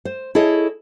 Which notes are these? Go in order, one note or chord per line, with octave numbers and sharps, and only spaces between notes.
C5
E4 G#4 A4 C#5 D#5